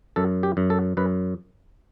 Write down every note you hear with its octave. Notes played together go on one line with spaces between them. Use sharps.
F#2 A4
G4
F#2
A4
F#2 B4